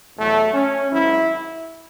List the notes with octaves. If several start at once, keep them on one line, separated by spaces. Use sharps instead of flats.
E2 B2 F#3 A3
C#4
G#1 G#2 F#3 E4